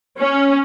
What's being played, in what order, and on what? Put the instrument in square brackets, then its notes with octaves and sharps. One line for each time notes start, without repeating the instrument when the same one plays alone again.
[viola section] C#4